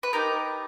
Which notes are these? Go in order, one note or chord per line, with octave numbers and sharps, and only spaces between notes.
B4
B3 D#4 G4 A#4